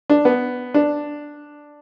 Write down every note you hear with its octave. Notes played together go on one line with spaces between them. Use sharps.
D4
B3
D4